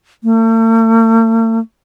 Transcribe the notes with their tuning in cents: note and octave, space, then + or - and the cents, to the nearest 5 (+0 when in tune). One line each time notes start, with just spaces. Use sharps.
A3 +45